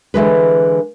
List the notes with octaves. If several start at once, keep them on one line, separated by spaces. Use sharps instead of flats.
D3 E3 G#3 B4